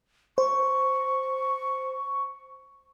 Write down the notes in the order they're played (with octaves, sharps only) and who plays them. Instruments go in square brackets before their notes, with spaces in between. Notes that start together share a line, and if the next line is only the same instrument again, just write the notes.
[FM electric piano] C5 [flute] C#6